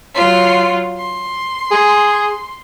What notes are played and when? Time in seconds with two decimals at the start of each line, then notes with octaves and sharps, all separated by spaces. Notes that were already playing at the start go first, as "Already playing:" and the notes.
0.14 F#3 F4
0.98 C6
1.71 G#4